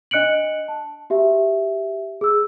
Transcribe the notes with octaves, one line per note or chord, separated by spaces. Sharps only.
D4 D#5 F#6 C#7 D7 F#7
A5
F#4 G4 E5
G#4 E6